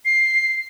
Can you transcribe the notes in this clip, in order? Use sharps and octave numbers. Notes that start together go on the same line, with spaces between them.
C7